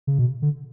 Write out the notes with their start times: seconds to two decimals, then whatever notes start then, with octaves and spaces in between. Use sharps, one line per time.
0.07 C#3
0.19 B2
0.42 D3